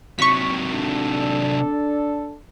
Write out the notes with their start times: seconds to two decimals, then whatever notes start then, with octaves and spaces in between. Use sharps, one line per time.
0.19 C3 F#3 C#6 B6
0.72 D4 A4